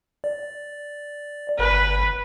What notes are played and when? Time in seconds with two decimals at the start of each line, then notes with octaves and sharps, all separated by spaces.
0.24 D5
1.59 G1 B4